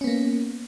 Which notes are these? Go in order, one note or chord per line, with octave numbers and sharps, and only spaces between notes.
A#3 B3 C#4